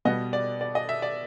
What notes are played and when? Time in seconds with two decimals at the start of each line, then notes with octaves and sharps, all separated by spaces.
0.05 B2 G3 B3 D#5
0.33 D5
0.61 D5
0.75 D#5
0.89 E5
1.02 D5